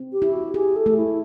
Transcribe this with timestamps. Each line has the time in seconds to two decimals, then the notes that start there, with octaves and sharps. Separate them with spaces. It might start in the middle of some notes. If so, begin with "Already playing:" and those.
Already playing: C4
0.12 G4
0.22 E4
0.33 F#4
0.54 G4 G#4
0.75 A4
0.86 A3
0.96 E4